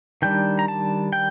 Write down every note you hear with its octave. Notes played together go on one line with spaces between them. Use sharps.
D#3 G3 D4 G5
A#5
A5
G5